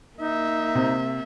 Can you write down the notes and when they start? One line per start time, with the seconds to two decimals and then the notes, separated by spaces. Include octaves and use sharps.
0.19 A#3 D#4 E5
0.75 C3